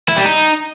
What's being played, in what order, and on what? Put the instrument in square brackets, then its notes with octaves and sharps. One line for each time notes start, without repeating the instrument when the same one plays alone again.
[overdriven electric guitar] E4
G3
D#4